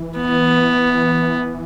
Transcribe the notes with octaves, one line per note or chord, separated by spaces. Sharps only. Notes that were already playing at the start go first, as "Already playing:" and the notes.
Already playing: E3
B3